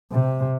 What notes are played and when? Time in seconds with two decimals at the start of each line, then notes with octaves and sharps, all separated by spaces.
0.12 C3